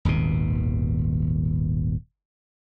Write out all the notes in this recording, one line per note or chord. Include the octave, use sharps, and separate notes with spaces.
D#1 G#1 D#2 B2